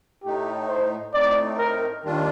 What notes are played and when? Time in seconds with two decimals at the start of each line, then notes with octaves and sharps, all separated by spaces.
0.24 A2 A3 D#4 G4
0.69 C5
1.14 A2 A3 C4 D#4 D5
1.58 A#4
2.03 D#2 D#3 G3 D4 F4